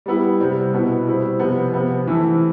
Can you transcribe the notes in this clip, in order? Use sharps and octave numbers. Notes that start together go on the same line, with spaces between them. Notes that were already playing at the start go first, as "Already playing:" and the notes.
G3 B3 E4 G4
C3 G3 C4
B2 B3 E4
G3 C4 E4
C3 F3 B3
C3 F3 B3
C3 E3 A3 C4 E4